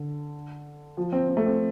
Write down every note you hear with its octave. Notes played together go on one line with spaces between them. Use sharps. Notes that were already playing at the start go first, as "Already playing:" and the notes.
Already playing: D3
F3
C4
C4
A3
C4